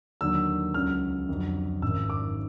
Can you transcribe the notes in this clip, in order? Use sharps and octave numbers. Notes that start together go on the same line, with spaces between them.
D#2 D3 F#3 E6
C#2 C#3 F#3 F6
F2 D3 F#3
G#1 F#2 D#3 E6
D6